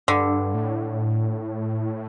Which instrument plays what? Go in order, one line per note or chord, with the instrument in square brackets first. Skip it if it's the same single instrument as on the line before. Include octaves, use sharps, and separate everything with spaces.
[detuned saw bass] G2 [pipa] D3
[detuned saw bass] A2